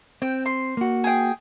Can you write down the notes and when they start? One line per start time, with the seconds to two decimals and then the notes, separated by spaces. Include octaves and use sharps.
0.22 C4 G5
0.46 C6
0.77 A#3 F#4
1.04 G#4 G5